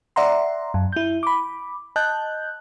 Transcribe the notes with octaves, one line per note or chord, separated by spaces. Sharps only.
D5 E5 F#5 A#5 C6
F#2
E4 G6
B5 D6
D#5 A5 F#6 G6